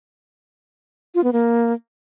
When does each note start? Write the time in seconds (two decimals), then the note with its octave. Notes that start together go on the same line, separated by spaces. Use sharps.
1.15 F4
1.24 B3
1.33 A#3